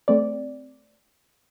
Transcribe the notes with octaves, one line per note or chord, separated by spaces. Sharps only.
A3 C4 D5